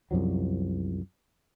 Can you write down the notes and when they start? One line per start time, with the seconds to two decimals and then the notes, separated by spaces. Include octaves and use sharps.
0.11 C2 F#2 F3 F#3